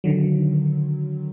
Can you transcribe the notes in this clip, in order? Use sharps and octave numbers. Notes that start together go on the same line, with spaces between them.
D3 D#3 F#3